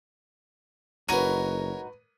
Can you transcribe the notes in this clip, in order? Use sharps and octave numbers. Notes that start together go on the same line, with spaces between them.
F#1 D#4 F#4 A#4 B4 C#5 D#7